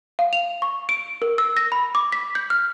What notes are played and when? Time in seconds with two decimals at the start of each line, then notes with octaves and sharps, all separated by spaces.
0.19 F5
0.33 F7
0.62 C#6
0.89 D7
1.22 A#4
1.38 E6
1.57 A#6
1.72 B5
1.95 D6
2.12 B6
2.35 G6
2.50 F6